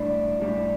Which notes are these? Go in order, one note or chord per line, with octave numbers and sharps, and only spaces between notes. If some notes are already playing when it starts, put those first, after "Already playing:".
Already playing: A2 G3 D4
A2 G3 D4